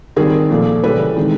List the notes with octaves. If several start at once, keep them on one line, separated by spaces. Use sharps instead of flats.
D#3 G3 C4 G#4 A#4
A#2 F3 A3
C#3 E3 G3 A4 B4
D#3 G#3 C4 D#4